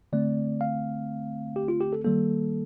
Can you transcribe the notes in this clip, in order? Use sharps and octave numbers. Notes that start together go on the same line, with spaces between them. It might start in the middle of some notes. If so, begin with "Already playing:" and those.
D3 A3 C4 D5
F5
G4
F4
G4
A4
D#3 G3 A#3 A4